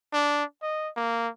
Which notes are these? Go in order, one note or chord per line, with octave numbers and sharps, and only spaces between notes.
D4
D#5
A#3